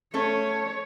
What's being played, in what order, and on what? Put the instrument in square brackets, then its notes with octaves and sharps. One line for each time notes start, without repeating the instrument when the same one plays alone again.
[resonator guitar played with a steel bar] A3 C#4 A4 [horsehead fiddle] C#5